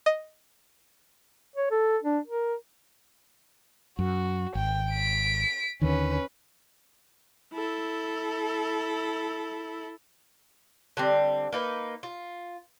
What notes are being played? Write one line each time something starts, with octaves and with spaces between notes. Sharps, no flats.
D#5
C#5
A4
D4
A#4
F#2 F#4
G#1 G5
B6 D7
D#2 D3 D#3 C#4 B4
E4 A4
D3 G3 C4
A#3 D#4 B4
F4